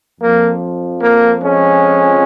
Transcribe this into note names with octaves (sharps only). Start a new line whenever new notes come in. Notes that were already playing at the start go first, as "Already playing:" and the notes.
F2 F3 A#3
A#3
G#3 C#4